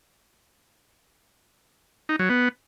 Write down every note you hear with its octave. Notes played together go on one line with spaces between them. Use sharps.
D#4
F#3
B3